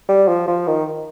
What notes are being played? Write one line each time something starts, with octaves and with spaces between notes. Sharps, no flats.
G3
F3
F3
D#3